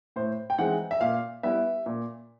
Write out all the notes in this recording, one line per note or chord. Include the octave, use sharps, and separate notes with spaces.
A2 C5
G5
E3 G#3 C4 D#4 F#5
E5
A#2 F5
G3 B3 E4 E5
A#2